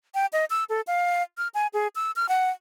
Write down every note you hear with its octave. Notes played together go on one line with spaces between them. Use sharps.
G5
D#5
E6
A4
F5
F6
G#5
G#4
E6
F6
F#5